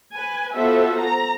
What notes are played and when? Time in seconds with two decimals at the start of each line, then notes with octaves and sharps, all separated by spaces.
0.13 B4 G#5
0.55 B3 F4 F#4 A4 C5 E5
0.97 A#5